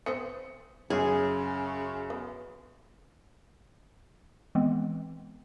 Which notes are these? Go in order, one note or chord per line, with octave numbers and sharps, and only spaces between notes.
B3 C4 C5 C#7
F#2 C#3 G#4 C#5 G#5
B3
E3 G#3 B3 C4